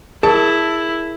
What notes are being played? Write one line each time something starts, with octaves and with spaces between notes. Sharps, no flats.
E4 G#4 A#4 A5